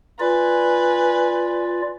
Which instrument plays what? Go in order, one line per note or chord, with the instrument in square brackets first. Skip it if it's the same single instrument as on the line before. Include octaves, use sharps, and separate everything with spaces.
[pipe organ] F4 D5 [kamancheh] B4 G#5